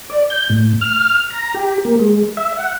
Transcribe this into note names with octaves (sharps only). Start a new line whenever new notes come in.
D5
G6
A2
F6
A#5
G4
A#3
G#3
E5
F#5